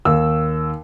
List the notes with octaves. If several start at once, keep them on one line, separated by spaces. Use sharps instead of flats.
D#2 E6